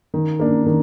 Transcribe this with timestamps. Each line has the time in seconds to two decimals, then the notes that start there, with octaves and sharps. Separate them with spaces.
0.14 D#3
0.40 A#3 D4
0.66 D#3